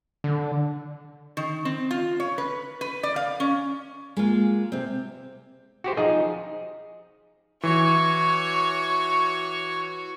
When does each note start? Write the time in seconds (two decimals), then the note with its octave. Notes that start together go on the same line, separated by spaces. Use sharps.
0.24 D3
1.37 D#3
1.65 C4
1.91 F4
2.20 C#5
2.38 B4
2.81 B4
3.03 D5
3.16 F5
3.40 C#4
4.17 G#3 A#3 F4
4.72 C3 C4
5.84 F#4 G4 C5
5.97 F3 D#4 G#4 D#5
7.63 E3 F#4 C#5 C#6